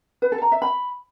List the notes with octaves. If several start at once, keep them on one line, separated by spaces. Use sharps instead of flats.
B4
A4
A#5
E5
B5